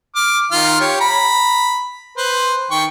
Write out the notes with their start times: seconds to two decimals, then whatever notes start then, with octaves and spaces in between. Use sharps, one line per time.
0.16 D6 F6
0.51 D#3 F4 F6
0.80 G4 C#5
1.00 A#5 B5
2.17 B4 C5
2.71 D#3 G5 C#6